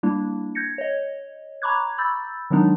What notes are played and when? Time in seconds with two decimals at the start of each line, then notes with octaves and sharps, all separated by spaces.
0.03 G3 A#3 D4 E4
0.55 G6 G#6 A#6 C#7
0.78 C#5 D#5
1.62 A#5 B5 C#6 D6 F#6 G#6
1.98 B5 E6 G6 A6
2.50 D#3 F#3 G#3 B3 D4 D#4